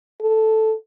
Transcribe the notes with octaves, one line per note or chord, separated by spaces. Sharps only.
A4